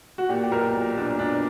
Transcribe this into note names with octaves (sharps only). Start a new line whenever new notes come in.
F#4
A#2 G4
G4
B1 A#4
A#2
B1 D4
B1 D4